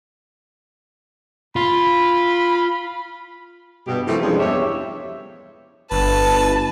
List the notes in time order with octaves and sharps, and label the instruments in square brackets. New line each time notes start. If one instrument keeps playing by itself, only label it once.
[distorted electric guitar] F4 [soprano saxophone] B5
[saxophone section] G2 B2 G4
C3 E3 F3 A3 A#3 G4
G2 C3 F3 G3 G#3 C#4
E2 G2 G4 C#5 E5
[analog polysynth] G1 [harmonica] B4 [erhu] A5